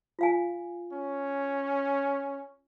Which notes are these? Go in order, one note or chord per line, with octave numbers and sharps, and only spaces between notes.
F4 F5 G#5
C#4